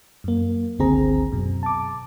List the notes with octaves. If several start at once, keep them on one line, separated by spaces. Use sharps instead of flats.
F#2 A#3
G1 C#2 D3 C4 G#4 A#5
F#2 B2
A5 D6